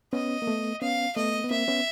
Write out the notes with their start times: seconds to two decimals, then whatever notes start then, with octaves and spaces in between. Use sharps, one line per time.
0.13 B3 C#4 D#5
0.42 A#3
0.47 A3 B3
0.81 B3 C#4 F5
1.16 A3 B3 D#5
1.44 B3
1.51 A#3 C4 E5
1.68 B3 C#4